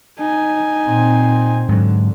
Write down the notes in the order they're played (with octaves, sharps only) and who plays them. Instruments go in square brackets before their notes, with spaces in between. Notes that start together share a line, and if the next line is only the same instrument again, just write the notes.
[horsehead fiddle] D#4 G#5
[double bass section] A#2 C4
[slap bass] G#2 F#3 [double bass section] D3